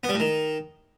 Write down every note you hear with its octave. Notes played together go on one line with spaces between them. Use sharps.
B3
G3
A2
D#3